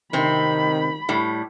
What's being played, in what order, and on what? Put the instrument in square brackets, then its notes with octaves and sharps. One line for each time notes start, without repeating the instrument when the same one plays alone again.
[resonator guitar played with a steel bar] C3 C4 [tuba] D#3 [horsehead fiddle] B5
[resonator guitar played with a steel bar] A2 G3